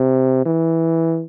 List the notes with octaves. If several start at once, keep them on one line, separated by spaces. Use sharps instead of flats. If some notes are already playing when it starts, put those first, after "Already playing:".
Already playing: C3
E3